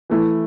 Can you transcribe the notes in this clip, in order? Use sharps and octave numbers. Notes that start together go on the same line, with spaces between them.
E3 A3 E4